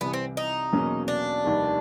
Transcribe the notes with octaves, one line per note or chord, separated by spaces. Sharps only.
C2 C3 E3 B3
C4
D#4
E2 B2 F#3 A#3 C#4
D4
F1 D#2 D#3 G3